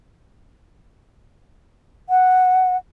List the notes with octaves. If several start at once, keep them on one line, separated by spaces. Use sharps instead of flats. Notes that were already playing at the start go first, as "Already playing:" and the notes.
F#5